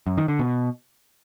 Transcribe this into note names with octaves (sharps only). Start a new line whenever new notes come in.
F#2
D#3
D3
B2